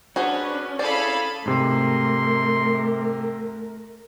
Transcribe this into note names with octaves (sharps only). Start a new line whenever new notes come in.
C#4 D4 F#4 G#4 B4 C5
E4 G#4 A4 C5 D5 F5 B5
G#2 C3 A3 A#4 C6